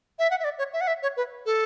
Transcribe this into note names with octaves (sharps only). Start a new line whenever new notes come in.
E5
F#5
E5
D5
C#5
E5
F#5
E5
C#5
B4
A4